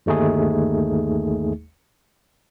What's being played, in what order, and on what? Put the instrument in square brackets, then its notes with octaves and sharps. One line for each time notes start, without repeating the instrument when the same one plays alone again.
[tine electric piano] G1 D#2 A3 D#4 G#4